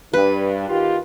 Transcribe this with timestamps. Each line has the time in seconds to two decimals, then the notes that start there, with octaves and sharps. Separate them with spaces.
0.14 G2 B4
0.68 D#3 F4 G4